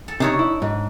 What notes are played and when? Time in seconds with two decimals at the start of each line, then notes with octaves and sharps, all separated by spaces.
0.08 A4
0.20 C3 D4 D#4 C#5
0.39 E4
0.62 G#2